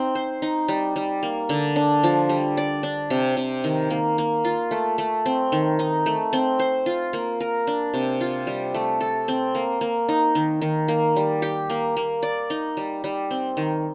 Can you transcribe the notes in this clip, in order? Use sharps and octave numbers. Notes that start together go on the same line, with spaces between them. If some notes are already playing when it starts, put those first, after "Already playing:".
Already playing: C4 D#4
C5
D#4
G3
G3
A#3
D3
D4
F3
G3
D5
D4
C3
C3
D#3
A#3
A#3
F4
A3
A3
C4
D#3
D#4
A3
C4
C5
F4
A#3
A#4
D4
C3
F4
G3
A3
A4
C4
A#3
A#3
D#4
D#3
D#3
A#3
G3
G4
A#3
A#3
D5
D#4
G3
G3
C4
D#3